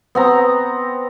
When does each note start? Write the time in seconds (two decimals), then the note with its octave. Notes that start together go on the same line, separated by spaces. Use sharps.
0.15 B3 C4 A#5